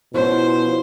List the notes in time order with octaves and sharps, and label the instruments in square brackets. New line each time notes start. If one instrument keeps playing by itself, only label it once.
[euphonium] B2 [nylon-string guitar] F3 C#4 [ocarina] E4 [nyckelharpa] C5